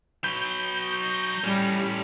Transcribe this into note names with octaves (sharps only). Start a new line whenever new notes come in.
F#3 B4 G6
D#4
A2 G3 C#4